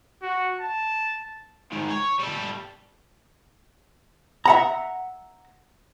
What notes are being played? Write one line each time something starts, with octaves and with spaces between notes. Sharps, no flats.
F#4
A5
G#2 D#3
C#5
G3 A4
E5 F#5 A#5